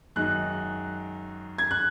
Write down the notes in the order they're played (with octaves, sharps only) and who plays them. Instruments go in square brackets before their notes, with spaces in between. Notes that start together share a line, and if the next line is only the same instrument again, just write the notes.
[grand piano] F#2 D#3 G#3 D#4 F#4 [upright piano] F#6
[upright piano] G#6
F#6